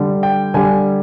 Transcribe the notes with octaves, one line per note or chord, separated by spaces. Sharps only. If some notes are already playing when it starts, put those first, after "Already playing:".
Already playing: D3 G3
G5
D3 G3 G#5